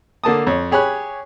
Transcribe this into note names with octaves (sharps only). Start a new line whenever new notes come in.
D3 A#3 A5 D#6
F2 C#5
G4 G#4 C#5 B5 F#6